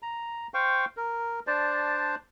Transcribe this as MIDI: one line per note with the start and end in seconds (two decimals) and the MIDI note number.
0.02 0.47 82
0.54 0.85 72
0.54 0.85 77
0.54 0.85 79
0.54 0.85 85
0.97 1.40 70
1.47 2.15 62
1.47 2.15 72
1.47 2.15 74
1.47 2.15 81